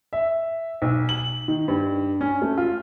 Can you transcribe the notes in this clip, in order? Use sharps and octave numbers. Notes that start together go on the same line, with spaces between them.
E5
B1
F#7
D#3
G2
C#4
A3
F4